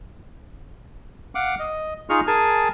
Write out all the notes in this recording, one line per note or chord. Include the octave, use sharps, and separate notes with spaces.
F5 F#5 D6
D#5
D#4 F4 G#4 D#5 C#6 F6
G#4 A#4 G#5 A5